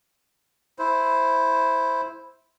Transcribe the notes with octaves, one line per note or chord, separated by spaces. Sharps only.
E4 C5